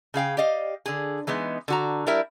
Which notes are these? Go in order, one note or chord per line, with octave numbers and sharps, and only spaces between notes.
C#3 G#4 F5 G5
G4 D5 D#5 F5
D3 G#4
E3 G#3 B3 D#4
D3 F#4 A#5
G3 E4 A#4 E5